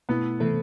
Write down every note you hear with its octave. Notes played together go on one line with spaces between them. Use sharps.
B2 A3 B3 E4
C3 E3 A3 B3